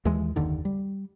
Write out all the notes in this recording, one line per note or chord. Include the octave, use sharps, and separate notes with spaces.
D#2 E3 G#3
F#1 D#2 D3 D#3
G3